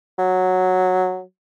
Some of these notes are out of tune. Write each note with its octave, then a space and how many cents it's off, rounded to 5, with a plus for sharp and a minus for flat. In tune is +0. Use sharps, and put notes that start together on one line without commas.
F#3 -5